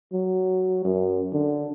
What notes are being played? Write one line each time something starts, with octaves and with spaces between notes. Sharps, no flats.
F#3
F#2
D3